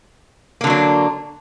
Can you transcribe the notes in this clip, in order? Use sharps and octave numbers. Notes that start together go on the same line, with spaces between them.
D3 F#3 A#3 D4